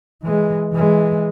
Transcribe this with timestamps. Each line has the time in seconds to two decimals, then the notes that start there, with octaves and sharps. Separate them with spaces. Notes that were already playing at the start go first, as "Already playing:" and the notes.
0.23 E3 G#3
0.72 E3 G#3